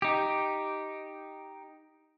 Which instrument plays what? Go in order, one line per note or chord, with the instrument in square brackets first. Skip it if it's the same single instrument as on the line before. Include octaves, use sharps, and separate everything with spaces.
[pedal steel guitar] D#4 G4